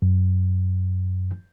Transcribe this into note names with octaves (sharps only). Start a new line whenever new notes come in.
F#2